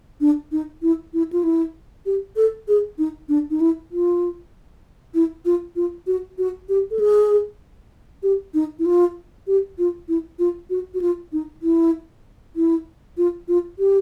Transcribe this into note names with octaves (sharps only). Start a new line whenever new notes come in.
D4
D#4
E4
E4
F4
E4
G4
A4
G#4
D#4
D4
D#4
E4
F4
E4
F4
F4
F#4
F#4
G4
A4
G#4
G4
D#4
E4
F4
G4
F4
E4
F4
F#4
F#4
F4
D#4
E4
E4
F4
F4
G4